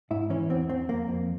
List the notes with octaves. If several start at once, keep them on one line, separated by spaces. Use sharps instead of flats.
G#2 E4
E3 C#4
E2 C4
E2 C4
F2 A#3
F2